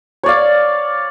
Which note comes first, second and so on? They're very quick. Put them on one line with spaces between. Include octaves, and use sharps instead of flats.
C#5 D5 F5